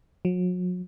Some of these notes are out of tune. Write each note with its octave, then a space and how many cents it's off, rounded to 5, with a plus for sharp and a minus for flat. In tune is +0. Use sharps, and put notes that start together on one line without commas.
F#3 -40